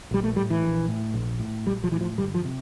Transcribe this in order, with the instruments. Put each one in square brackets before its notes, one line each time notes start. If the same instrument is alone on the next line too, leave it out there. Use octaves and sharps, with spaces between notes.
[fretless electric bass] A#1 G3
A3
A2 G3
E3
A#1
A2
A#1
A2
A#1 G3
F3
A2 E3
F3
G1 G3
F3
C3